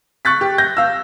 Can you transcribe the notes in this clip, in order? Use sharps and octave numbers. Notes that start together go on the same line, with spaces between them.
C#6 F#6 A6 B6
G4
G6 A#6
F5 E6